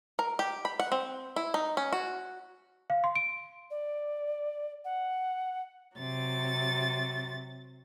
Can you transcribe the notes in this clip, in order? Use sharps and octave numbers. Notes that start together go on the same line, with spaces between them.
A#4
G4
B5
F#5
C4
E4
D#4
C#4
F#4
F5
C6
D7
D5
F#5
C3 F#3 A6